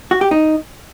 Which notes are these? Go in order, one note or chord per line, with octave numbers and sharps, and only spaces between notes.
F#4
G4
D#4